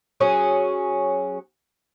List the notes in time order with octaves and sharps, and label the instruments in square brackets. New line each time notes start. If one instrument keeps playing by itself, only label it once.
[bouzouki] F#3 C#4 G#4